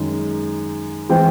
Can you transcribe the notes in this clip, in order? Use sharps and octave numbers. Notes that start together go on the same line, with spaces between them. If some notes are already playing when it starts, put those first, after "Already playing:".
Already playing: F#2 D#3 G#3
E3 G#3 C4 G5